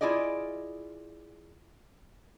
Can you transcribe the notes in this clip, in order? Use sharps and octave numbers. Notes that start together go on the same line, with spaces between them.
E4 F4 G#4 D5 D#5